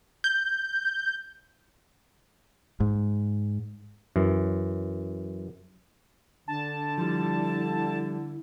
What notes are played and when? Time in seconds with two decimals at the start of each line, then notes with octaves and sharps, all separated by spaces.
0.24 G6
2.80 G#2
4.16 F#2 E3
6.48 D3 D4 A5
6.98 F3 G3 E4